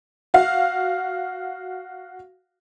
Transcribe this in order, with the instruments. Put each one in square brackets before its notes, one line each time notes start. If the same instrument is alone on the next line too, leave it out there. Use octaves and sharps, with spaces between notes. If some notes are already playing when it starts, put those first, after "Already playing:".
[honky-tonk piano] F#4 F5